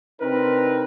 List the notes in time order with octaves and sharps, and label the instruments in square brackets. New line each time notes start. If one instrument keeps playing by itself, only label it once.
[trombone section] C3 C4 D4 D#4 A#4 B4